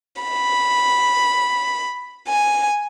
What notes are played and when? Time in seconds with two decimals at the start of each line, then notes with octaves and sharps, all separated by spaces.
0.22 B5
2.28 G#5